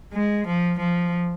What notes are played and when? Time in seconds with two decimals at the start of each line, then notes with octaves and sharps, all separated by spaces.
0.14 G#3
0.47 F3
0.79 F3